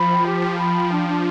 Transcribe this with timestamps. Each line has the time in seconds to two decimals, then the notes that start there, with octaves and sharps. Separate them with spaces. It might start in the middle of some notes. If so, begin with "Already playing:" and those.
Already playing: F3 B5
0.10 G5
0.25 G4
0.42 F3 G5
0.58 B5
0.75 G5
0.91 D4
1.07 D4